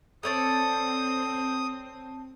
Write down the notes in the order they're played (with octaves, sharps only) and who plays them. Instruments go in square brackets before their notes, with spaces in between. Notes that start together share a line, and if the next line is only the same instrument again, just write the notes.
[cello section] C4 [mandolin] A4 C#5 D5 [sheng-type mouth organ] D#6